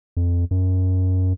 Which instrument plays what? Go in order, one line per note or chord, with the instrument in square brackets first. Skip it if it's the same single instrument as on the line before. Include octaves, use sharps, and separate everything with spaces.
[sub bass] F2
F#2